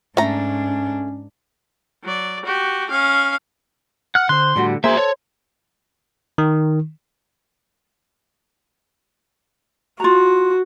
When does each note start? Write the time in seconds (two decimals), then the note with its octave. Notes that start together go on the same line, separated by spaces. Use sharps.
0.17 G#2 A3 C#4 D4 A#5
2.04 F#3 D5
2.45 F#4 G4
2.90 C#4 F5
4.15 F#5 F6 F#6
4.29 D3 C5 C6 F#6
4.56 A2 D3 G3 F#4
4.84 A#3 F#4 G#4 C5 E5
4.97 A4 C#5
6.38 D#3
10.00 F4 F#4 A#5